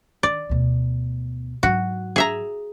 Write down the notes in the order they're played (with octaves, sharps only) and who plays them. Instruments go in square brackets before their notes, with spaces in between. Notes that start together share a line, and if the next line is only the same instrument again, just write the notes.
[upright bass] D#3 [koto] D5
[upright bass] D2 B2
[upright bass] G#2 F#3 [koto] F#4
[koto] G#4 E5 A#5